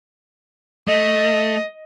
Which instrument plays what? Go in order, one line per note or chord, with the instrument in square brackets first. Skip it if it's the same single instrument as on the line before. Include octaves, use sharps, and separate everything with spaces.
[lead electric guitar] A3 [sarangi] D#5